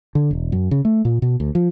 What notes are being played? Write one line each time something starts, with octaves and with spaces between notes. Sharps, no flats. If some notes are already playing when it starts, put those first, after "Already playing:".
D3
E1
F#2
C#3
A3
A#2
B2
D2
F3